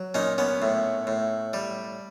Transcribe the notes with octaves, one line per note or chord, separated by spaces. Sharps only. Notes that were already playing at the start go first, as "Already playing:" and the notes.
Already playing: F#3
A#2 C#4 D#4
B3 C#4
A2
A2
G3